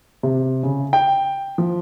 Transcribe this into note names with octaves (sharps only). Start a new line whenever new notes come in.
C3
C#3
G5
F3